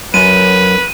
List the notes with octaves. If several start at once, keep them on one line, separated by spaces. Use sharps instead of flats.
F#2 B4 D#7